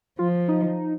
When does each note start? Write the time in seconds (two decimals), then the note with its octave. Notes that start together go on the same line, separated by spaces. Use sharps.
0.19 F3 F4
0.48 D#4